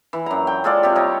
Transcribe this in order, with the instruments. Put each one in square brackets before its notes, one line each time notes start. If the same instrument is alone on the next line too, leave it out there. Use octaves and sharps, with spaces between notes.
[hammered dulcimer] E3
F#2 A#5
G5
G#3 F4 A4 D5
C3 F4 G4
G3 D#4 C#5